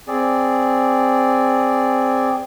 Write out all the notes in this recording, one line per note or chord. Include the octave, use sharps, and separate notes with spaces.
C4 G#4 D5